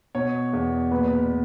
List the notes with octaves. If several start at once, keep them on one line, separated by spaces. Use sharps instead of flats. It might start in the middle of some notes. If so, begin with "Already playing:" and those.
B2 C#5
E2
A#2 B4
A#2